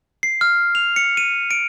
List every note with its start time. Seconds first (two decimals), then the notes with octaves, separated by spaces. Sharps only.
0.23 C7
0.41 F6
0.75 F7
0.96 C#7
1.17 D#7
1.51 D7